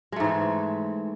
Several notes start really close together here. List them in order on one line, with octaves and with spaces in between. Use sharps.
G#3 A3 G#2 E3